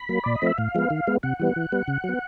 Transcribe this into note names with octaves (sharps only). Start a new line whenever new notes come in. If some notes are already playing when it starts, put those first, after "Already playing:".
Already playing: B5
F#3 A#3
A#2 D5
D#5
F3 A3 C4 E5
A2 F5
F3 G#3 B3
D#3
G#3 B3
C3 F#5
E3 G3 B3
E3
G3 B3
C#3
F#3
B3